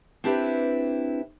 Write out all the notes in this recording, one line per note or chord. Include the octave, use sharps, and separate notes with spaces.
C4 D4 E4 G4 B4